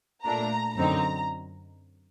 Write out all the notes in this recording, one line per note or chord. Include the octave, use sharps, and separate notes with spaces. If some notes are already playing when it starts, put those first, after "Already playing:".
A#2 A3 D4 A#5
F#2 D3 F#3 C4 D#4 A#5